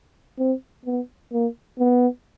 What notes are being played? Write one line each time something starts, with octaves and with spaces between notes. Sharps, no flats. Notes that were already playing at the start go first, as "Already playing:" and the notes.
C4
B3
A#3
B3